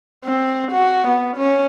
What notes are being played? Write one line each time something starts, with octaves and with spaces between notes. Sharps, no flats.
C4
F#4
B3
C#4